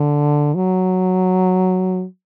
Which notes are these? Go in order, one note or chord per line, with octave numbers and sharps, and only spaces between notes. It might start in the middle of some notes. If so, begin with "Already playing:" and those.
Already playing: D3
F#3